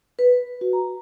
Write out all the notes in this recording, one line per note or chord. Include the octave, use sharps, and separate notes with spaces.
B4
F#4
A#5